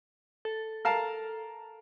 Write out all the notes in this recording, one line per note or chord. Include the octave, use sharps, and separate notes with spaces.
A4
A#4 F5 A5